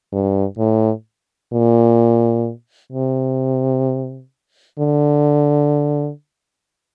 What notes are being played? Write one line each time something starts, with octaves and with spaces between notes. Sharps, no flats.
G2
A2
A#2
C3
D3